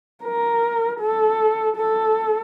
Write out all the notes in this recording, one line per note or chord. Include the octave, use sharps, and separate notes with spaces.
A#4
A4
A4